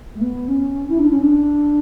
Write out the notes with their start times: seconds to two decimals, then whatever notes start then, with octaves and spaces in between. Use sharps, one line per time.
0.16 A3
0.21 B3
0.48 C#4
0.89 E4
0.99 D4
1.10 C#4
1.21 D4